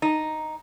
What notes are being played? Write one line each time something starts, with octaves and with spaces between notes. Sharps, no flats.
D#4